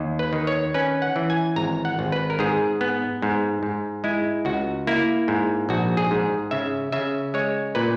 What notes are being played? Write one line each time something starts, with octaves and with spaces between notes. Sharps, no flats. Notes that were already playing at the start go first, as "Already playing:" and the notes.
Already playing: D#2
B4
D#3
C#5
C#4 B4
F#5
E3
G#5
G#1 A#5
F#5
G#1
B4
A#4
G#2 G#4
B3
G#2
G#2
G#3 E4
C#2 F#4
A#3 E4
G#2
A#1 F#4
G#4
G#2
C#3 E5
C#3 E5
G#3 C#5
A#2 B4